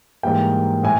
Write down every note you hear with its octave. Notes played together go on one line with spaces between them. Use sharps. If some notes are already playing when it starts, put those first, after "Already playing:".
G#2 E3 G3 A#3 G5
A2 G#5